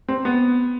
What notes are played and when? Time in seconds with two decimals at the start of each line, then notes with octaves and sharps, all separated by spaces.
0.09 C4
0.25 B3